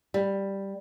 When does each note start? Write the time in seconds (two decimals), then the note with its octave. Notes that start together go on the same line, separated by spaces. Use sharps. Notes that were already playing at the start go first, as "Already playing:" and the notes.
0.14 G3